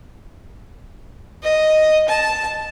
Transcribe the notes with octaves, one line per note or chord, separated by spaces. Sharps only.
D#5
A5